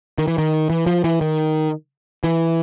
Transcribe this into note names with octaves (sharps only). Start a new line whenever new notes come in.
D#3
E3
D#3
E3
F3
E3
D#3
E3